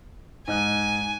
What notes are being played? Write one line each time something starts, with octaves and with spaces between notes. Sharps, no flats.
G#2 D#5 G#5 F#6